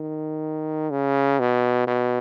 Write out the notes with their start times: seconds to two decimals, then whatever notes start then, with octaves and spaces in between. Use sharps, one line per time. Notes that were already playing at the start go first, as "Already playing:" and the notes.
Already playing: D#3
0.90 C#3
1.39 B2
1.87 B2